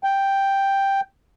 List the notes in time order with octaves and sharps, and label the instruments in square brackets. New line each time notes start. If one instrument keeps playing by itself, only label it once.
[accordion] G5